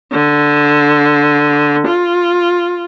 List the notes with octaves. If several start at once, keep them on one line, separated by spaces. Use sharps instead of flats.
D3
F4